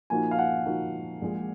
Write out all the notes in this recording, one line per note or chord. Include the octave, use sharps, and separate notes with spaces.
A#2 F3 A#3 D#4 F#4 G#5
F5
F#5
A#2 F3 A#3 D#4 F#4
A#1 A#2 G#3